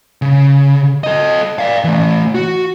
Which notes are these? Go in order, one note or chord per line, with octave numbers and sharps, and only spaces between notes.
C#3
A4 D#5
D5 F5
E3 A3
F#4